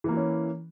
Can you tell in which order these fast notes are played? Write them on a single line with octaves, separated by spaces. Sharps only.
E3 A#3 E4 C#4